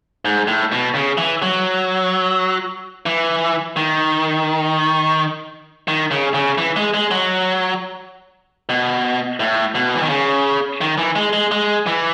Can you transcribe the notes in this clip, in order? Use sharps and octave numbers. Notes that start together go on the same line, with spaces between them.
G#2
A2
B2
C#3
E3
F#3
E3
D#3
D#3
C#3
C#3
E3
G#3
G#3
F#3
B2
A2
B2
E3
D#3
C#3
D#3
E3
G#3
G#3
G#3
E3